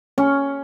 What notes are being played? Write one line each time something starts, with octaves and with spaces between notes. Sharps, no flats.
C#4